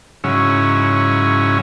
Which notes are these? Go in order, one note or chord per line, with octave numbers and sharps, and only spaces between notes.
G#2 C#3 F#3 C#4 E4